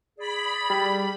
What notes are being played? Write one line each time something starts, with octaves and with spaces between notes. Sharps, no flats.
G#4 D5 B5
G3